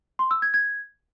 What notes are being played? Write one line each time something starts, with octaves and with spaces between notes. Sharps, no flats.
C6
E6
G#6
G#6